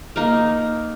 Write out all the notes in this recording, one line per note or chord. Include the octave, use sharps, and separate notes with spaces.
A#3 D#4 A#4